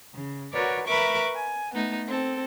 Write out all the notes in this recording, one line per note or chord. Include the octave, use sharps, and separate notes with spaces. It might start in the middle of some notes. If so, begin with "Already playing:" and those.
C#3
F#4 A#4 B4 C#5 D5
A#4 B4 E5 B5 C#6 D6
G#5
A3 B3 D#4
C4 A4